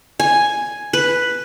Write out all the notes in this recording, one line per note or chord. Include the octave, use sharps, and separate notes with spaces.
G#5
B4